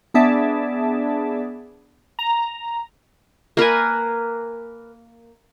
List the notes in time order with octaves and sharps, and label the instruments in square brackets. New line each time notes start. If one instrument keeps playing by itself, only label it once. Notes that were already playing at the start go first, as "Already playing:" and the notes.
[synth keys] B3 D4 G#4 D5 E5 A5
A#5
[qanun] A#3 A#4 B4 G#5